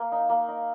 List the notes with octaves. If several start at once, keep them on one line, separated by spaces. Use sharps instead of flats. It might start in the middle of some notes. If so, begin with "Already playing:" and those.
Already playing: A#3
D#4
A#3
D#4